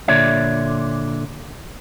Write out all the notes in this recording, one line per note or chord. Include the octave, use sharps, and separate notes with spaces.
A#2 D3 C#5 D5 E5